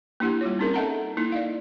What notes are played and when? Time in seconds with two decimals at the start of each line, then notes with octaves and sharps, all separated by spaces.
0.20 A#3 D4 E4 G4 F#5
0.41 G3 F4 C#5
0.59 C4 C#4 D#4 G#4 A#4
0.74 A4 D#5 E5 F#5 A5 A#5
1.17 A#3 D#4 E4
1.32 D5 D#5 F5